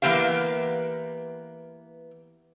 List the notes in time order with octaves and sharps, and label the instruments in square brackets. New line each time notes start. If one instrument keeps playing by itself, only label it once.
[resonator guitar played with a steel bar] E3 A#3 B3 G4 F5